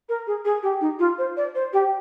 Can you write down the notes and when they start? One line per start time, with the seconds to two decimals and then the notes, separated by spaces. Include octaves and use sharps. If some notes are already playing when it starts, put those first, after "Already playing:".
0.09 A#4
0.27 G#4
0.45 G#4
0.63 G4
0.81 D#4
0.99 F4
1.18 C5
1.37 D5
1.55 C5
1.73 G4